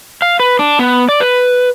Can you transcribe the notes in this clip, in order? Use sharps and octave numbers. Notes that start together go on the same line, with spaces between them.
F5
B4
D4
B3
D5
B4